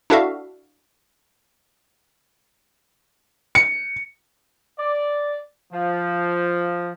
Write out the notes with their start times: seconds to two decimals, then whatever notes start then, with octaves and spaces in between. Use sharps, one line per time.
0.10 D4 E4 F#4 A4 E5 F5
3.55 C#7
4.78 D5
5.72 F3